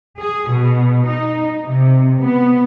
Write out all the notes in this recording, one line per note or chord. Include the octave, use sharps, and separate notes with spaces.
G#4
B2
D#4
C3
B3